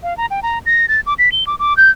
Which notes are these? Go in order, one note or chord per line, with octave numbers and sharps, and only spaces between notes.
F5
A#5
G5
A#5
A#6
A6
D6
B6
G7
D6
D6
G6